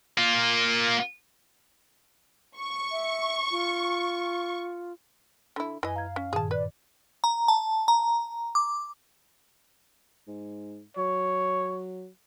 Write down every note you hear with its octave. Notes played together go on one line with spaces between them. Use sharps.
A#3 F4
C#6
E5
F4
D3 E4 B5
F#2 E3 D#5 G#5
F5 A#5 G#6
C#4
G2 A#2 D#3 G#4 A5
B4 D5
A#5
A5
A#5
D6
G#2
F#3 C#5